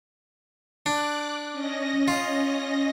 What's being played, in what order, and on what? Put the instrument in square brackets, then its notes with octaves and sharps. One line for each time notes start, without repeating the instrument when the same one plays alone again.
[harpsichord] D4 [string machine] D6 F#6
[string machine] C#4 D#5 A#6
[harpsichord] F4